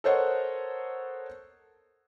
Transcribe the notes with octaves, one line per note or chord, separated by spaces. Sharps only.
A4 A#4 C5 C#5 D#5 F#5